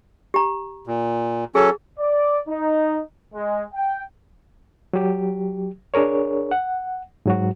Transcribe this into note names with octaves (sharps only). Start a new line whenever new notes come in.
G4 A#5
A#2
F#3 C#4 G#4 A4
D5
D#4
G#3
G5
F#3 G4
D4 G#4 A#4 C#5
F#5
G#2 F#3 F#4